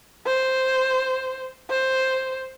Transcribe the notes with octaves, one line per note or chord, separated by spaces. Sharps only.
C5
C5